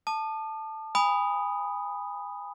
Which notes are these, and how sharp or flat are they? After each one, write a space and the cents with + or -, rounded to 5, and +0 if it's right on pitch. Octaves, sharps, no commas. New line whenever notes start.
A5 +0 D#6 -45
G#5 -35 B5 +0 D#6 +0